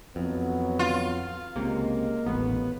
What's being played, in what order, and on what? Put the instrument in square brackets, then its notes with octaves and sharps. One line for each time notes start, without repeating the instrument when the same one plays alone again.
[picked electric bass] F2 [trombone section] E3 F#3 B3
[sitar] F4
[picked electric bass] C#2 C3 [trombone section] G#3 [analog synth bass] A#3
[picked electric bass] D#1 A1 [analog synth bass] B3